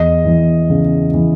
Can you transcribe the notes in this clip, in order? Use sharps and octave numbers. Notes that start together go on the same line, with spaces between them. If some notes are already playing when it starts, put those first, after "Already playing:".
Already playing: E2 D#5
E3
C#3
E3